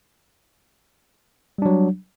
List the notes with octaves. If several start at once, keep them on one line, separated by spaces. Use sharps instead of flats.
F#3 G3 D4